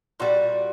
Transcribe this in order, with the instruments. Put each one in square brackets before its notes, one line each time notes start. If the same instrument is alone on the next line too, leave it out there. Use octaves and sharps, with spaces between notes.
[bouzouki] A#2 G3 F#4